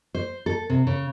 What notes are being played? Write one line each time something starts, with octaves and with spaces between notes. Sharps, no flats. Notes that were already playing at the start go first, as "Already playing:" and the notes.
C5
A4
C3
C#3